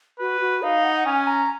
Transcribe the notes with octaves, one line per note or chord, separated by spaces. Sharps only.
F#4 B4
F#4
D#4 F5
F#5
F#5
C#4 G#5
A#5